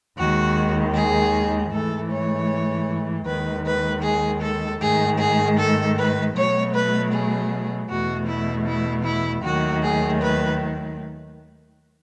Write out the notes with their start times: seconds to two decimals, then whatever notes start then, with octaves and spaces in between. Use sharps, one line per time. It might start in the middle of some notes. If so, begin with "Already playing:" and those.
0.17 D#2 D#3 G#3 F#4
0.94 G#4
1.71 G#2 E3 A3 A4
2.10 C#5
3.25 D#2 D#3 G#3 B4
3.65 B4
4.03 G#4
4.42 A4
4.80 G#2 D#3 A3 G#4
5.19 G#4
5.58 A4
5.97 B4
6.35 B2 F#3 A3 C#5
6.73 B4
7.12 G#4
7.89 E2 B2 A3 F#4
8.28 E4
8.66 E4
9.05 E4
9.43 D#2 D#3 F#3 A3 F#4
9.83 G#4
10.21 B4